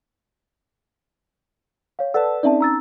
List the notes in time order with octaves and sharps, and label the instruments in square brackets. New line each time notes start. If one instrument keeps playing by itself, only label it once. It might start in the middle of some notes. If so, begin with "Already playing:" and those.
[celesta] C#5 F5
[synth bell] A4 B4 A5 [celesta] D5 F#5 E6
[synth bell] C4 C#4 D#4 [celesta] D5 E5 A5
[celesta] A#5 E6 A6